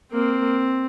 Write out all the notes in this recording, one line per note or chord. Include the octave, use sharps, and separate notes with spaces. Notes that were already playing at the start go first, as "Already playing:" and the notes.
A#3 C4